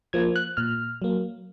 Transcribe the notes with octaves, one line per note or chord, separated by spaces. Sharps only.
F3 A#3 G#6
F#6
A#2 F6
F#3 A#3